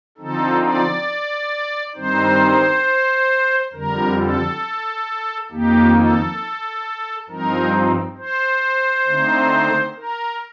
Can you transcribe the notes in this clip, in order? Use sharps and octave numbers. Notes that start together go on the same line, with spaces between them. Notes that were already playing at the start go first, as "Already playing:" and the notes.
D3 F3 C4 D#4 A4
D5
G2 D#3 G3 C4 D#4 C5
F2 D3 G3 A#4
A4
F2 D#3 A#3 D#4 G4
A4
G2 F3 C4 D#4 A#4
C5
D3 A3 C4 D#4
A#4